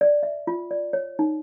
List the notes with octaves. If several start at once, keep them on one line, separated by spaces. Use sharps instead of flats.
D5
E5
F4
D5
C#5
D#4